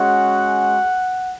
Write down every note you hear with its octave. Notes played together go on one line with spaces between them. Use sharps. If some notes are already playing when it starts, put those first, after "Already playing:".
Already playing: G#3 C#4 F#4 F#5